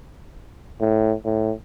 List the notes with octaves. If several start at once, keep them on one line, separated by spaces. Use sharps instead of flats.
A2
A2